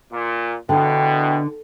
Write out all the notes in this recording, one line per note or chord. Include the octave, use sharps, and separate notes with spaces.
A#2
E2 B2 D3 G5